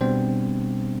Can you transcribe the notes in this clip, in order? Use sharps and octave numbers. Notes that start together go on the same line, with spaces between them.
B2 G3 B3 C4 D4 C5